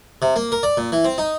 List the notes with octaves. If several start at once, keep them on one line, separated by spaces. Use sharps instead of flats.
C3
A#3
A#4
D5
A#2
E3
C4
D#4